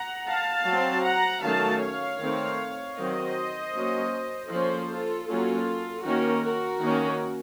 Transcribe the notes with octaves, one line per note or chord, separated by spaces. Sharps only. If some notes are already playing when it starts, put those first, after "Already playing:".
Already playing: F#5 A#5
F5 A5
F#3 C4
F#5 A#5
D#3 F#3 A3 C#4 F5 A5
C#5 F5
D#3 A3 C4
D#3 F#3 C4 C5 D#5
F#3 A#3 C#4
F3 A#3 C#4 A4 C5
F4 A4
F#3 A#3 C#4 F4 A4
D#3 A#3 C#4 F#4 A#4
F#4 A#4
D#3 A#3 C#4